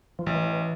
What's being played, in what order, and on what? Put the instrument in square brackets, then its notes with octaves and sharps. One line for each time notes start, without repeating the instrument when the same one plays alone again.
[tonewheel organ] F3
[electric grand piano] A1 [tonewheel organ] E3